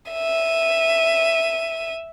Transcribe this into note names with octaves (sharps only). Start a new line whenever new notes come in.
E5 D#7